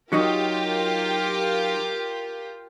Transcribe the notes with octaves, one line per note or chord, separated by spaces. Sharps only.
F#3 D#4 F4 G4 A#4